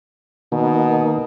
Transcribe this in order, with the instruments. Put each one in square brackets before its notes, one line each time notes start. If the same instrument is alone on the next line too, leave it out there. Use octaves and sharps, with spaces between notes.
[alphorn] B2 [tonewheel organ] D#3 A#3 D#4